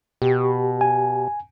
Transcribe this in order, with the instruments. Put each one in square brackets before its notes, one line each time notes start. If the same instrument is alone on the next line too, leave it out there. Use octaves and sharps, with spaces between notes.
[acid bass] B2 [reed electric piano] G4
[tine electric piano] G#5